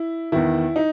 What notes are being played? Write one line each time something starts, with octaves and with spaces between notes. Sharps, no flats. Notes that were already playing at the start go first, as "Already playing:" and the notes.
Already playing: E4
E2 D#3 E4
D#4